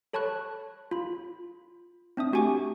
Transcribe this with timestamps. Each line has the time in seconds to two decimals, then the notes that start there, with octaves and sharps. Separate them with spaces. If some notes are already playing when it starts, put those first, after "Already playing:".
0.13 A4 C#5 A5 B5 C#6 F#6
0.91 F4 B5
2.17 C4 D4 E5 D#6
2.33 A3 F#4 G4 G#5 C#6 D6